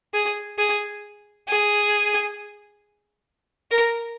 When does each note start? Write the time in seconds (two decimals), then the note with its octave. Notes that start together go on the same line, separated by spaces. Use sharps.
0.14 G#4
0.58 G#4
1.48 G#4
3.71 A#4